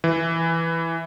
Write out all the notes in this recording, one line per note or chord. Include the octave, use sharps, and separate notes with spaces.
E3